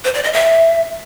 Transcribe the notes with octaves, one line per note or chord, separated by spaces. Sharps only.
C5
D5
D#5
E5